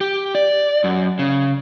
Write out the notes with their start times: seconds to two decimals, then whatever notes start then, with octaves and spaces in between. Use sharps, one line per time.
0.01 G4
0.35 D5
0.84 F#2
1.19 C#3